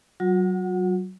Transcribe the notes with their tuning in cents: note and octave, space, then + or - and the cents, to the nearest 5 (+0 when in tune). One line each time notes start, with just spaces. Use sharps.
F#3 +25 F#4 -45 F#5 +0